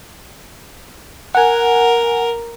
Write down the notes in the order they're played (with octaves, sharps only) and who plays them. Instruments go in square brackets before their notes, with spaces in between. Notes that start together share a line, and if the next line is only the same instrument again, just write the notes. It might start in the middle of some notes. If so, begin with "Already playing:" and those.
[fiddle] A#4 [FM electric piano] F#5 G#5